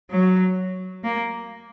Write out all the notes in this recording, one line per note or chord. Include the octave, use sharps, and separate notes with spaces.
F#3
A#3